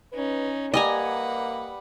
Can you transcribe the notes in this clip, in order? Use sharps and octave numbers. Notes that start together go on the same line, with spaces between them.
C#4 D#4 B4
G3 A#3 B4 D#5 F#5 G#5 A#5